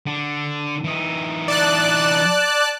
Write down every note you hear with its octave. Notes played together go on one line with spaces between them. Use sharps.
D3
E3 D#4
D5 A5 F#6